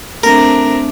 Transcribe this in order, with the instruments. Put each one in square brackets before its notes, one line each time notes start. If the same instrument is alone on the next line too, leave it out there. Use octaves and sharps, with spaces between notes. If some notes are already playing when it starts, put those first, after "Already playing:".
[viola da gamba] A3 C4 D4 [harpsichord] A#4